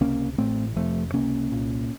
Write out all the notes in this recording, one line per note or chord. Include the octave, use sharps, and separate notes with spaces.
C#2 C3 A#3 C#4
A1 A2 A3 C4
F1 F2 C3 F3 A3
C#2 C3 A#3 C#4
C2 A#2